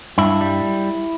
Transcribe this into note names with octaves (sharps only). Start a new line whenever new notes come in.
G2 E4
G3